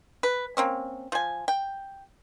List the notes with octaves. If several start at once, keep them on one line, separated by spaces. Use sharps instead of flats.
B4
A#3 C4 C#4
F3 G#5
G5